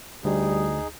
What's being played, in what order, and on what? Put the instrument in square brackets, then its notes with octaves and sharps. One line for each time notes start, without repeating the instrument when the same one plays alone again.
[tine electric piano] D2 [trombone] G3 [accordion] D#4 G#4